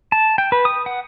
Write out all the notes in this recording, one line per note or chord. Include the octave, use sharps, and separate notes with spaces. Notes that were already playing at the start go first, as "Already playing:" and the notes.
A5
G5
B4
D#6
F#5